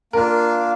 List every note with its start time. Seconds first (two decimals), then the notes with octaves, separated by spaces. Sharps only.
0.13 A#3 D4 F4 A#4